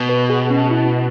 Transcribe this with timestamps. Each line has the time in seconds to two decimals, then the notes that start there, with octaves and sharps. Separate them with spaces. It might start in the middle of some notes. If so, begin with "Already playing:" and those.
Already playing: B2
0.09 B4
0.30 G#4
0.50 C#4
0.71 E4